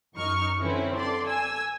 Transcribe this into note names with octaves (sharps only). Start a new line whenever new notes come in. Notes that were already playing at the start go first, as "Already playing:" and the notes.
F#2 D#4 C#6 F6
D3 C4 C#4 E4 B4
A4 D5 C6
G#5 E6